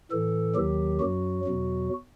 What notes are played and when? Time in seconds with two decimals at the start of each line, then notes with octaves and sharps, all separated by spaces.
0.11 A2 E3 A4
0.55 D#2 D#3 F#3 G4
1.00 F#2 F#3 F#4
1.45 E2 B2 F#3